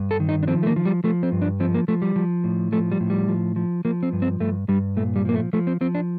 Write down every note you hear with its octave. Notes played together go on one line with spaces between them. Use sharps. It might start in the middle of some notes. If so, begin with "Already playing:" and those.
Already playing: G2
A4
D#3
D#4
D4
F3 C4
A3
A#3
F3
G3
F3 A3
C4
G2
D4
F3 C4
A#3
F3 A3
G3
F3
A2
F3 A3
G3
A2
G3
F3
F3
F3 A#3
C4
G2
C4
G2 A3
G2 G3
A#2 A3
G3
F3 A#3
A3
F3 A3
C4
F3 C4
D4